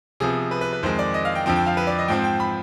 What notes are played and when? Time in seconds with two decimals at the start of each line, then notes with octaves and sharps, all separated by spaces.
0.20 C3 F3 B3 G#4
0.51 B4
0.61 B4
0.73 B4
0.83 F2 D#3 G#3 C5
0.99 D5
1.14 D#5
1.25 F5
1.35 G5
1.46 F2 D3 F3 C4 G5
1.56 G5
1.66 F5
1.77 B4
1.87 D5
1.98 D#5
2.08 G#2 F3 C4 G5
2.24 G5
2.40 B5